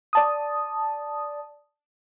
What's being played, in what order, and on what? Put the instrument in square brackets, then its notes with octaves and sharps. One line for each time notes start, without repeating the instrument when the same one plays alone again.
[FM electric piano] D5 A5 D#6